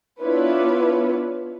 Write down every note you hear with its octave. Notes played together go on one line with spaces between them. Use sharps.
B3 D4 E4 F4 B4 C#5